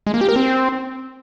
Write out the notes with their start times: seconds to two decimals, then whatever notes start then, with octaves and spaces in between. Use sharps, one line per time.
0.07 G#3
0.14 A#3
0.21 G4
0.29 A#4
0.36 C4